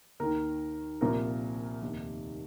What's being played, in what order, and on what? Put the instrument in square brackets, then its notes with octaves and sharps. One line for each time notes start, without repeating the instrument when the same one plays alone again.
[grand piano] D#2 D#3 A#4
C2 A#2 F3 A#4
F1 D#2 D#3